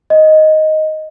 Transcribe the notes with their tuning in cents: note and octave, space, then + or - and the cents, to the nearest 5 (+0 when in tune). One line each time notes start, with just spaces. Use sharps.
D#5 +5